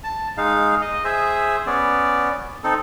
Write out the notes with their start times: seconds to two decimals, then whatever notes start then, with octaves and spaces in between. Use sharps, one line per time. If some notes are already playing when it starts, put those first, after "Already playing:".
0.04 A5
0.37 G#3 D#4 F5
0.81 D#5
1.04 G#4 C5 E5
1.66 B3 C#4 D5
2.64 C4 D#4 A4